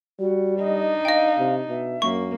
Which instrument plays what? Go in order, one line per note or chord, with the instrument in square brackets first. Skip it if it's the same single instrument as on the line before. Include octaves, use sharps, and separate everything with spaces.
[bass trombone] G3 [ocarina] F#4
[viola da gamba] D4 D#4 [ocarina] D#5
[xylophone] D#5 G5 [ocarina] F5
[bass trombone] C3
[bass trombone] B2 [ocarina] E5
[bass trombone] F#2 [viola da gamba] A#3 [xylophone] C#6